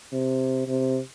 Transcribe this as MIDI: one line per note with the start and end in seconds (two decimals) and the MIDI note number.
0.12 0.63 48
0.68 0.99 48